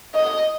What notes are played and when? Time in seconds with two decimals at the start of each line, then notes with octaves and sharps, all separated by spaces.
0.14 D#5